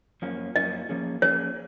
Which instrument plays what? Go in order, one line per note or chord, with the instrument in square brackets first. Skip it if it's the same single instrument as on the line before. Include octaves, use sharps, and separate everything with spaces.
[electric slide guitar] F#2 F3 A#3 C#4
[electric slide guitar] F#2 F3 A#3 C#4 [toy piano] D#5
[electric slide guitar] F3 A#3 C#4 G#4
[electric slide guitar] F3 A#3 C#4 G#4 [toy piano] C#5